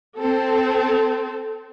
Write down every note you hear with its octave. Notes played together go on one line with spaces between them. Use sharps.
C4 A4